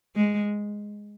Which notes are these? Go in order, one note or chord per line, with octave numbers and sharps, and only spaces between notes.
G#3